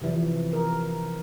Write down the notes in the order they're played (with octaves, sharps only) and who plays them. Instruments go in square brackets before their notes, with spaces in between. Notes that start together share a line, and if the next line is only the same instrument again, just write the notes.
[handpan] C3 E3 F3
A#4